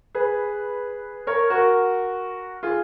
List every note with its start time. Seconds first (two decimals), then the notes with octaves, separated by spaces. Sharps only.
0.15 G#4 B4
1.27 A#4 C#5
1.50 F#4 A#4
2.63 F4 G#4